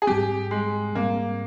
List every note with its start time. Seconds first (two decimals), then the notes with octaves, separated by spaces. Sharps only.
0.02 G#4
0.07 G#2 G3 C4 G4
0.51 G#3
0.95 G#2 G3 A#3 C4